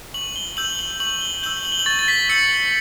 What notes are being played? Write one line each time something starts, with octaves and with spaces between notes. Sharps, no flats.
C#6 F#7
G7
E6 G6 F#7
F#7
C#6 F#7
G7
E6 G6 F#7
F#7
G7
F#7
C#6 A6
A6
B6
E6 G6 C#7